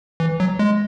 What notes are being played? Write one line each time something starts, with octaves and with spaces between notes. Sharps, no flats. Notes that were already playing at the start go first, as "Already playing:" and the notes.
E3
F#3
G#3